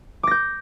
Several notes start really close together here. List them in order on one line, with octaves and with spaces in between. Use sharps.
D6 A#6 G6